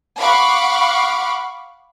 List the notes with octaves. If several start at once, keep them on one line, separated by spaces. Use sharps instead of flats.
F5 F#5 B5 C#6 D6